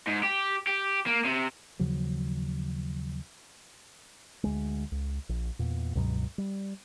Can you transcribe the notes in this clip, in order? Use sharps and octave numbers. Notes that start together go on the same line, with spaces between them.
G#2
G4
G4
A#3
C3
D#2 C#3 F3 F#3
D2 G#3
C#2
A#1
E2 A#2
C#2 G2 B2 F#3
G3